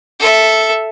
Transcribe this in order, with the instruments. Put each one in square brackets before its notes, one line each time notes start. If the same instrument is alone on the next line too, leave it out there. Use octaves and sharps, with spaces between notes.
[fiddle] A4 E5